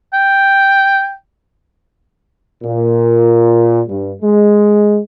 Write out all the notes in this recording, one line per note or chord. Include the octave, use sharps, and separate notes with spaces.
G5
A#2
G2
G#3